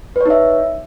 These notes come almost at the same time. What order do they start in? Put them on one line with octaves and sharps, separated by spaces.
B4 C#5 D#4 E5